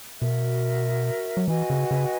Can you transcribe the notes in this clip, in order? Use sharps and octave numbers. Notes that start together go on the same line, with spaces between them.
B2 F#4 A#4 E5
F#3
E3 F#4 B4 D#5 G#5
C#3
C#3